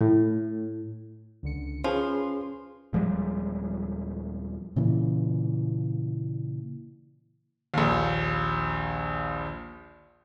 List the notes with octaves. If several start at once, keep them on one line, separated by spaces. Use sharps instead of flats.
A2
C#2 D3 C#7
F3 C#4 G#4 B4 C6
D#1 F3 G3 G#3
A#2 C#3 E3
A#1 D#2